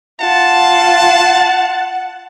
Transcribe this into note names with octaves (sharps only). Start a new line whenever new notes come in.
F4 F#5 A5